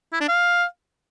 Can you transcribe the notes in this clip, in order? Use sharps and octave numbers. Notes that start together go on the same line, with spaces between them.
E4
D4
F5